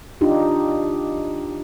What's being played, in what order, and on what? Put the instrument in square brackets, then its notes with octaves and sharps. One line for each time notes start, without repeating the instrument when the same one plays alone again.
[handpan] D4 D#4 F4 G4